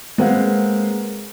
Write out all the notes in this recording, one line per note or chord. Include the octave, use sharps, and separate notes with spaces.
G#3 A#3 C4 B4 F5 F#5